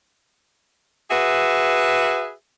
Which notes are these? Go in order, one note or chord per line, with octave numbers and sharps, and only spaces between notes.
F#4 G#4 B4 E5